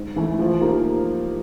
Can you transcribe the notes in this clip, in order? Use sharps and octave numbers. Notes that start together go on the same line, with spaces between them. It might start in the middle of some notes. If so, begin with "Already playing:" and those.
Already playing: G#2
E3 A3
F3
A#3 D#4 G4